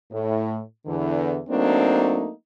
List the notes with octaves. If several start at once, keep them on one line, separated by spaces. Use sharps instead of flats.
A2
E2 D3 E3
F#3 A3 A#3 C4 D4 D#4